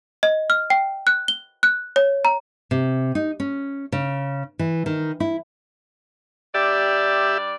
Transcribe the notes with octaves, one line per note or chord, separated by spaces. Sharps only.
D#5
F6
G5
F#6
G7
F#6
C#5
A#5
C3
D#4
C#4
C#3
E3
D#3
E4
G3 D4 G4 D5 E5